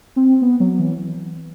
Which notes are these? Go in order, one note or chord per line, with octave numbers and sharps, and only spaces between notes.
C4
B3
F#3
E3